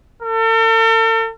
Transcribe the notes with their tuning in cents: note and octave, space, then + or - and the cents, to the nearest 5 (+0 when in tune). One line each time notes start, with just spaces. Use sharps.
A4 +45